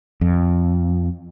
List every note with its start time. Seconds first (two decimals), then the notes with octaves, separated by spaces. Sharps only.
0.21 F2